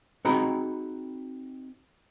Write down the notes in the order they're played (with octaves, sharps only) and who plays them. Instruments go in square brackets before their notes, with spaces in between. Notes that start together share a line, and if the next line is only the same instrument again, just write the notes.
[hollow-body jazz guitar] C4 D#4 F#4 G#4 A#5 B5